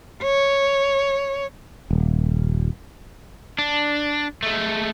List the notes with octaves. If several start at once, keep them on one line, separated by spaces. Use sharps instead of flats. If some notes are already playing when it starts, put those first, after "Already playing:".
C#5
D#1
D4
G#3 A3